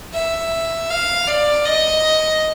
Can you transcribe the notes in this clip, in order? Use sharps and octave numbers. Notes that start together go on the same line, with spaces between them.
E5
F5
D5
D#5